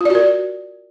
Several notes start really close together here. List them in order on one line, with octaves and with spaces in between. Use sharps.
F4 D5 F#4 A#4